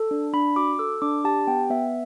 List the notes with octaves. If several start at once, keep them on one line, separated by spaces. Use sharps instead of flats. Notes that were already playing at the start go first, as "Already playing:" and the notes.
Already playing: A4
D4
D4 B5
F#4 D6
A4 E6
D4 D6
G4 A5
B3 G5
B3 E5